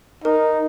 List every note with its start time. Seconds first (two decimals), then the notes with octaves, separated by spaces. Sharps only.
0.24 D#4 A#4